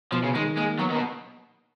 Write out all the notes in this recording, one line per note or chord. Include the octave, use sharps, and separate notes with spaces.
B2 F3
C#3
D#3 G#3
G#3 A#3
F#3 B3
D#3
B2